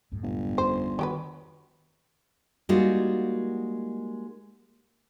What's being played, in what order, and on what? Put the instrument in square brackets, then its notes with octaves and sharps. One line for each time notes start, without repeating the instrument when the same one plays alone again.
[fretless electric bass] C2 F#2 A2
[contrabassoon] G1
[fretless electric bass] F2 C#4 [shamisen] C5
[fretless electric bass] D#3 [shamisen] F#3 G4 B4
[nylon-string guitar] G3 G#3 A#3 D#4 F4 F#4